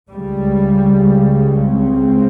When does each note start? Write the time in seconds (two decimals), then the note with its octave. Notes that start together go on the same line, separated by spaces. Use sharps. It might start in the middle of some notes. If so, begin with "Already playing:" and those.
0.11 C#2 C#3 G3
1.66 C4